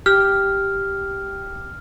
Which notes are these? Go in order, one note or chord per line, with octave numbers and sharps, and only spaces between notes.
G4 F6